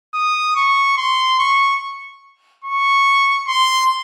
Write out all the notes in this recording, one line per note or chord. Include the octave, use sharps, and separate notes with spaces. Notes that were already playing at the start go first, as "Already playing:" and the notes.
D#6
C#6
C6
C#6
C#6
C6